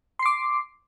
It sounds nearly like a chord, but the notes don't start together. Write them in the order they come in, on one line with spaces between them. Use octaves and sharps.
C6 C7 D6